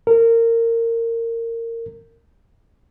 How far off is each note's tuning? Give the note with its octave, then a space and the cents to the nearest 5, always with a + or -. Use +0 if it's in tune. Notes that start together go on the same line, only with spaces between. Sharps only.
A#4 -25